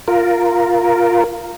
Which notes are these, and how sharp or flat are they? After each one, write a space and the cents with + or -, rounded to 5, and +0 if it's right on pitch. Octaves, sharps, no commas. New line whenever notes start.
F4 +0 A#4 +0